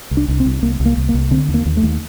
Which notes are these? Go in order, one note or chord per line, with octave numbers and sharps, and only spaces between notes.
C2
D4
C2
C4
C2
C2 A#3
C2
A#3
C2
A#3
C2
D3 C4
D#2
A#3
D#2
A3
D#2